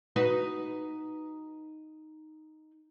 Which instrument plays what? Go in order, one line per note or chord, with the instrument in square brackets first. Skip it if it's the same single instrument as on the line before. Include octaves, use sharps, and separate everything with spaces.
[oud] D#4 F#4 B4